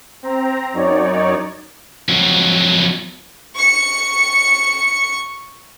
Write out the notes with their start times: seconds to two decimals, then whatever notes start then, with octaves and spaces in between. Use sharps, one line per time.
0.23 C4 A#5
0.73 F#2 D#4 C#5 D5
2.09 F2 F#3
3.55 C#6 C#7